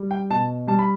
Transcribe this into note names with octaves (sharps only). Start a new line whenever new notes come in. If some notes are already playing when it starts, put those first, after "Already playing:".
Already playing: G3
G5
B2 A5
G3 A5
B5